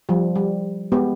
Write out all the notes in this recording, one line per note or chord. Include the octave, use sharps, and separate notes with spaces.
F3 G3
G3
G#3 B3 G4